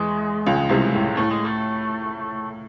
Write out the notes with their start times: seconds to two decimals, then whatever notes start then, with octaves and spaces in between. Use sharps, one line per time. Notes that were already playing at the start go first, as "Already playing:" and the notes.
Already playing: E2 E3 G#3
0.46 C#2 C#3
0.69 C2 C3
0.94 A2
1.17 A2 A3
1.31 G#3
1.45 A3